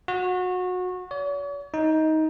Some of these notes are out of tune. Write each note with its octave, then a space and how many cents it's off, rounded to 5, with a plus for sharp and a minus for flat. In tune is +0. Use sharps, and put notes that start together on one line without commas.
F#4 -25
C#5 +45
D#4 +15